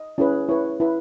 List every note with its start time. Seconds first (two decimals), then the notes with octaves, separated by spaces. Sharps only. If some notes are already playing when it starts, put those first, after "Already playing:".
Already playing: D#5
0.18 C#4 E4 G#4 B4
0.49 E4 B4 C#5
0.80 E4 B4